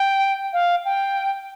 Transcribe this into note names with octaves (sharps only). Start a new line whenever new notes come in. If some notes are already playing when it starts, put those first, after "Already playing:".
Already playing: G5
F5
G5